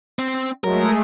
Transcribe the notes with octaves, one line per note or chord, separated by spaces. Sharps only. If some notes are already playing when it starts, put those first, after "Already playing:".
C4
F#3 G#3 A3 A#4